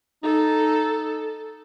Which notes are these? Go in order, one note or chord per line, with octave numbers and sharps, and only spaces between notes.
D#4 A4